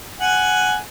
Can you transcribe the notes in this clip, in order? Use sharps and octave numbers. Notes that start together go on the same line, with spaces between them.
F#5 G#5